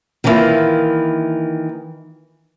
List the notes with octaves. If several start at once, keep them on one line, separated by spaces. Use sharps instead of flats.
D#3 E3 A#3 C#4 E4 F4